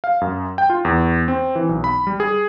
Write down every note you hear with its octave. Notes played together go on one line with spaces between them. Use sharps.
F5
F#2
G5
F4
E2
C4
E3
B1
B5
G3
G#4